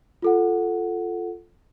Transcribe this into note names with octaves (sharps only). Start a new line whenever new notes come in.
F4 A4 F#5